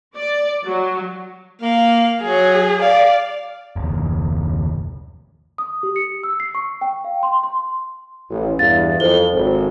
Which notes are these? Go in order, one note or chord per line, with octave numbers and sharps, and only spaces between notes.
D5
F#3
A#3 F5
F#3 G#4
D5 F5
F#1 D#2
D#6
G4
C#7
E6
C7
C#6
G5
F5
C6
C6
A1
E2 G2 F5 A6
F2 A4 C5 G7
G#1